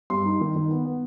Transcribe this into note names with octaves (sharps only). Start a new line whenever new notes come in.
G2 C6
D#4
D#3
D#3
B3
B3